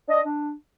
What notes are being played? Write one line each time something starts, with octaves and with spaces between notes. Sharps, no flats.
D4 D#5
D4